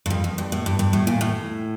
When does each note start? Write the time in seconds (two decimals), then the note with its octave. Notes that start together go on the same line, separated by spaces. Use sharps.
0.06 G2
0.10 F2
0.24 F2
0.38 G2
0.52 A2
0.66 G2
0.79 G2
0.93 A2
1.07 A#2
1.21 A2